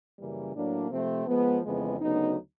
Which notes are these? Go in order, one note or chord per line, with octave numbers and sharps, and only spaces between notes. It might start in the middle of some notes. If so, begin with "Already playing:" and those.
F#2 C#3 E3 G3 A#3
A2 F#3 A#3 D4
C3 F3 A3 C4
F3 G#3 B3
F2 C#3 E3 G#3 B3
D2 C#3 F#3 B3 D#4